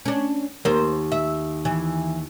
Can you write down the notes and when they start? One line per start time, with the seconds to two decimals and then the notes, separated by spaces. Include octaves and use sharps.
0.05 C#4 D4
0.65 D#2 A#4 C5
1.12 E5
1.65 E3